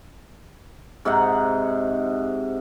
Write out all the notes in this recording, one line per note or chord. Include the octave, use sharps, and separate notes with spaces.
G#2 C3 D#4 F#5